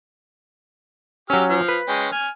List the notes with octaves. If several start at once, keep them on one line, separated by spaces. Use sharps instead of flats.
F#3 C#4 G4 E6 F6
F3 F5
B4
G#3 C#4 G5
G#5 F6